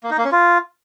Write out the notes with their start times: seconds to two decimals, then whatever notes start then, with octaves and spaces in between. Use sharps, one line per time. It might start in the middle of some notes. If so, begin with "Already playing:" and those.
0.03 A#3
0.11 D#4
0.18 A#3
0.25 C#4
0.32 F4